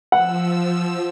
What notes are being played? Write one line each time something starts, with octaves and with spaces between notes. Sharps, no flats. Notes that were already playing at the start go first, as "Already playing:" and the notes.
F3 F#5 E6